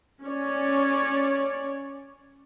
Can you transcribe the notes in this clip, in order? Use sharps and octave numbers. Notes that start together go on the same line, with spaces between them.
C#4 C#5 D5